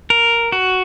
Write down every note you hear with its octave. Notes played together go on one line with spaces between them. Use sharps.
A#4
F#4